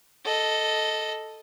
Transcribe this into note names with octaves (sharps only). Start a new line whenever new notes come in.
A4 D#5